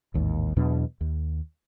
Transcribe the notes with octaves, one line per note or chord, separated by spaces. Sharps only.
A1 D#2 G#2
E2 B2 F#3 D4
D#2